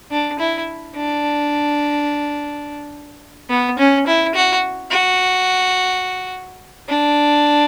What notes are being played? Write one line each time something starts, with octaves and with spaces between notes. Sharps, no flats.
D4
E4
D4
B3
C#4
E4
F#4
F#4
D4